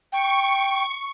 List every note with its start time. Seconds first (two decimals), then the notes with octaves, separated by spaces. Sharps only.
0.12 G5 C#6